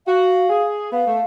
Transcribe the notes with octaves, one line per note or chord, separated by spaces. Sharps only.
F#4 F5
G#4
B3 F5
A3